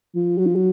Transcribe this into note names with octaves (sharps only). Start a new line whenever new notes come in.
F3
F#3
F3
F#3